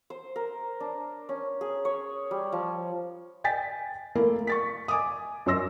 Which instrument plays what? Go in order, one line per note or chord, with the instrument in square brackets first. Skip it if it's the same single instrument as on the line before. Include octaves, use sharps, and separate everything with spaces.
[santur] C5
A#4
D4
C#4
G#4
C#5
G3
F3
[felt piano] G5 G#5 A6 B6
A3 A#3 E4
C#6 A6 B6
G#5 D6 D#6
F#2 C#5 C6 E6 A#6